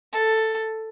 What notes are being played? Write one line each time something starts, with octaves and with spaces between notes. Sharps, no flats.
A4